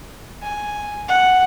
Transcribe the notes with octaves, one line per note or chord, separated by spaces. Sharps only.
G#5
F#5